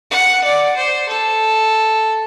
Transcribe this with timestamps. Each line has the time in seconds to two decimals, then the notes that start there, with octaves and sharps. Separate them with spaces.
0.11 F#5
0.44 D5
0.76 C5
1.09 A4